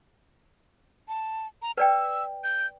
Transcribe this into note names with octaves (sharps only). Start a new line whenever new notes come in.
A5
A#5
B4 D5 G5 E6
G6